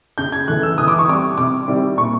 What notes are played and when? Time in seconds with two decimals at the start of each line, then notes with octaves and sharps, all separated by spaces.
0.18 C#3 G6
0.32 G#6
0.48 E3 A3 F#6
0.63 E6
0.78 E3 D#6
0.88 D6
0.99 C#6
1.08 G3 C4 D6
1.38 C3 D6
1.68 D#3 G3 C4 E4
1.97 A#2 C#6